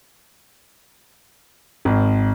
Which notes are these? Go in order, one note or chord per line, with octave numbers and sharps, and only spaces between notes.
G#1